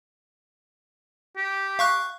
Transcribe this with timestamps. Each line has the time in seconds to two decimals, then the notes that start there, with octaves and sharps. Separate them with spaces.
1.36 G4
1.79 F5 C#6 F#6